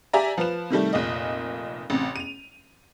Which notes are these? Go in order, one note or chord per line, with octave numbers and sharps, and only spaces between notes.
G4 D5 E5 G#5 A#5
F3 B4 E7
C3 D#3 G3 A3
F1 A#2 D#5
A1 C3
D#7 F7